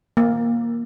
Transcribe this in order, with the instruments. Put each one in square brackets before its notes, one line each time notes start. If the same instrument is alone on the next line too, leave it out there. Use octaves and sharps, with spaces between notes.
[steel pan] A#3